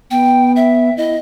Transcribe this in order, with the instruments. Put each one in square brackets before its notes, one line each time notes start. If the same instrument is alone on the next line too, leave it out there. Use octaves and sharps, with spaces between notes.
[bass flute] B3 [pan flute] G5
[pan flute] E5
[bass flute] E4 [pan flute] D#5